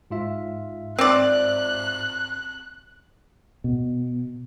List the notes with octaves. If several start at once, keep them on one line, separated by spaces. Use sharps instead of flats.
G#2 F4 E5
C4 D5 F#6
B2